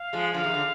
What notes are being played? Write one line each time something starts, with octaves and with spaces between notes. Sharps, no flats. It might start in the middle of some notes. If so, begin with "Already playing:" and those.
Already playing: F5
F3 G#3
D3 F3 F5
C3 D#3
D3